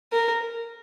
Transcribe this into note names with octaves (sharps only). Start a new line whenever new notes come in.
A#4